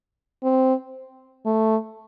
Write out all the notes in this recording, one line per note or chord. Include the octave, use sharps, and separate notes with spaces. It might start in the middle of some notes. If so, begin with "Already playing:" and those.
C4
A3